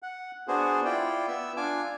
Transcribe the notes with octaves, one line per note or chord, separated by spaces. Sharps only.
F#5
B3 D4 F#4 G#4 C5
E4 F4 D5 G5
B3 E5 E6
D4 F4 G#5 D6